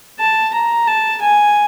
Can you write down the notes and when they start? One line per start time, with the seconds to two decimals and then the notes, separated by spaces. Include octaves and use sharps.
0.19 A5
0.54 A#5
0.87 A5
1.22 G#5